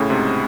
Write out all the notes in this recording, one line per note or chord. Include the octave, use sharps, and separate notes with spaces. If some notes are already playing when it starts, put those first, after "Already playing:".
Already playing: A2 C#3
G#2 C3